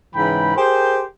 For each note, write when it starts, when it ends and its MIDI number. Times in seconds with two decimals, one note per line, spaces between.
0.16 0.54 44
0.16 0.54 49
0.16 0.54 52
0.16 0.54 79
0.16 0.54 83
0.57 1.03 67
0.57 1.03 68
0.57 1.03 70
0.57 1.03 72